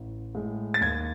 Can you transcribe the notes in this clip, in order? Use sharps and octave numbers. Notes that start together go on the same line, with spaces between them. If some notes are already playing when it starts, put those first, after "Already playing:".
Already playing: A1
A2 G#3
A6
D#2 G#6